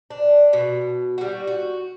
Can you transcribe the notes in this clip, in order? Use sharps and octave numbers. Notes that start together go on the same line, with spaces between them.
D4
B2
G3 F#4
F#4